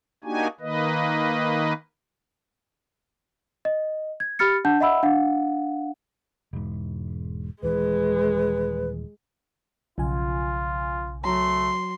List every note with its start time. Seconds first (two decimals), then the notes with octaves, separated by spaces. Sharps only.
0.24 A#3 D4 D#4 F#4 G4 G#5
0.60 D#3 A#3 B4 D#5
3.65 D#5
4.20 G#6
4.39 G4 B5 F6 A6 C#7
4.65 D4 F#5 A5 G6
4.80 D#5 E5 F#5 B5 E6
5.03 D4 F5 F#5
6.53 E1 G#2
7.63 D#1 E3 G#3 B4
9.98 B1 C#3 F3 F4 G#5
11.24 F#3 A3 A#5 C6